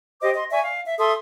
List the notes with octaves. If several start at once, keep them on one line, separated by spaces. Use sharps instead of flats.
G4 C5 D#5 D6
D#5 C6
D5 E5 G#5 C#6
F5
E5
A4 E5 C6 D#6